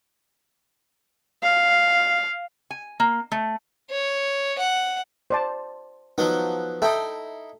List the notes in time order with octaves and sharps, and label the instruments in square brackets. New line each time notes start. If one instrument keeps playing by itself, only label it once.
[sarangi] F5
[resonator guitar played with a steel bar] G#5
A#3
A3
[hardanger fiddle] C#5
F#5
[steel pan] C5 D5 A5
[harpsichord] F3 F#3 B3 [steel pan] D#4
[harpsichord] D#4 E4 [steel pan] A4 E5 G5